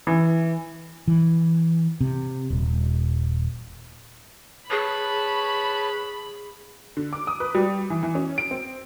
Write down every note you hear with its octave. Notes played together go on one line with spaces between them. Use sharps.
E3
E3
C3
D#1
G#4 B4 C#5 A5 B5
D3
D6
D#6
B4
G3
E3
E3
C#4
D7
C4